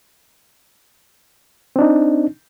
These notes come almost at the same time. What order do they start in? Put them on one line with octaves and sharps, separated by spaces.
C4 D4 D#4